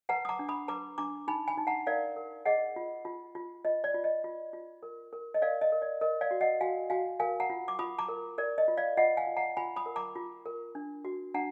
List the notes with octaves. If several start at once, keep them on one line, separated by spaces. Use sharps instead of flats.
B4 F#5 A#5
D#6
A#5 D6
D4
B5 D#6
B4 A#5 D6
D4 A#5 D6
D#4 G#5 B5
G#5 B5
D#4
F#5 A#5
A#4 D5 F5
A#4
G#4 D#5 F#5
F4
F4
F4
F4 D#5
D5
F4
D#5
F4
F4
A#4
A#4
D#5
A#4 D5 F5
D#5
A#4
D5
A#4 D#5
D5 F5
F#4
D#5 F#5
F#4 F5 G#5
F#4 F5 G#5
A#4 F5 G#5
F#5 A#5
F4
D6
F4 B5 D#6
A#5 D6
A#4
A#4 D5
D#5
F4
D5 F5
F4 D#5 F#5
F5 G#5
F4
F#5 A#5
F4 G#5 B5
B5 D#6
A#4
A#5 D6
F4
A#4
D4
F#4
D4 F#5 A#5